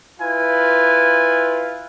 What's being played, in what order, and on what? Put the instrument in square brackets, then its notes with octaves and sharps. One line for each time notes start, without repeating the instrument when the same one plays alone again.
[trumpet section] E4 F4 B4 G#5